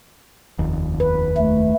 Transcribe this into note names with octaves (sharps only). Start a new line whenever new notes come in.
F1 D#2
B4
A3